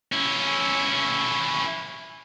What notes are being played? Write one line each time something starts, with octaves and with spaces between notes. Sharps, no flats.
C#4 E4